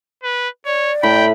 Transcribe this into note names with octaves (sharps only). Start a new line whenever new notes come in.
B4
C#5 D5
A2 G5 B5